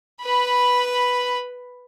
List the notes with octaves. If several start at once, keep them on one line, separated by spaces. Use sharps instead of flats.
B4 B5